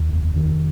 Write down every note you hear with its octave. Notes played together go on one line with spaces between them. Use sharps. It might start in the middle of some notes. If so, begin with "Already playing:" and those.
Already playing: D#2
F1
D#3